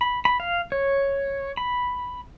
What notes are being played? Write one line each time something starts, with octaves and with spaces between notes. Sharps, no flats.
B5
B5
F5
C#5
B5